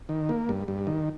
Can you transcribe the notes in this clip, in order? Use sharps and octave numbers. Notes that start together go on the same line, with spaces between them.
D#3
A#3
G2
G2
D#3